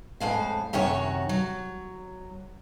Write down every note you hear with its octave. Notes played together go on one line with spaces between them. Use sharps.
F2 A2 G#3 F5
F#2 C3 D#3 F#4 C#5
F#3